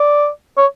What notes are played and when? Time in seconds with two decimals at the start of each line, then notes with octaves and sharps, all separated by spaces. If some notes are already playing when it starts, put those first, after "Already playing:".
Already playing: D5
0.57 C#5